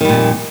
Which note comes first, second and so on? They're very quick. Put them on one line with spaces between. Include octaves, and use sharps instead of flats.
D#3 G3 A#2 F2